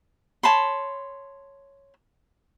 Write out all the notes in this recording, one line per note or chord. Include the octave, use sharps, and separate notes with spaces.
C#5 A5 B5 C6